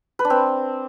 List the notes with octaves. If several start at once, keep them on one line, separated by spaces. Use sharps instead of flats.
B4
D4
C4